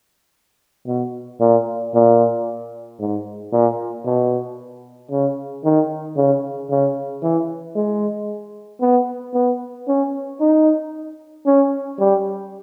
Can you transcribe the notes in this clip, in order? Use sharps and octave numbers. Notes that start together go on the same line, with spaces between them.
B2
A#2
A#2
G#2
A#2
B2
C#3
D#3
C#3
C#3
E3
G#3
B3
B3
C#4
D#4
C#4
G3